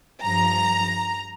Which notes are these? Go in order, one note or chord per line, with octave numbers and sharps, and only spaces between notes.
G2 F3 A#5